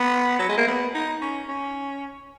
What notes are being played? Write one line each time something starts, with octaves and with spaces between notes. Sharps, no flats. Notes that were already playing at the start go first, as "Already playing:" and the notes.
Already playing: B3
F#3
G#3
A#3
B3
D#4
C#4
C#4